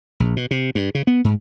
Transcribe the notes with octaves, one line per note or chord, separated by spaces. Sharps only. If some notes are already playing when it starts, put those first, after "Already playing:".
A#1
B2
C3
G2
C#3
B3
G#2